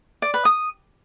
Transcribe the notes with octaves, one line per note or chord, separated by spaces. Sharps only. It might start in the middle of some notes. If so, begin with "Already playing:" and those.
D5
B4
D#6